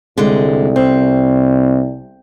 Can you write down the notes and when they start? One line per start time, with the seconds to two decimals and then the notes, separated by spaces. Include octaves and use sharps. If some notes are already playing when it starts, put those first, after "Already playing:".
0.18 C2 D3 G#3
0.76 C4